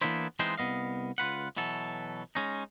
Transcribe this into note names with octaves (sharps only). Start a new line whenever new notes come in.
E3 A#3 B3 D4 E4 C5
E3 G#3 B3 C4 D#4 C5
C2 B3 D#5 F5
C#2 F4 B4 F#5
B2 E3 F#3 A4
G#3 C#4 D#4